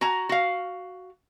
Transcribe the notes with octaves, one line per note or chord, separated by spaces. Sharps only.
F#4 G#5 A#5
F#4 F5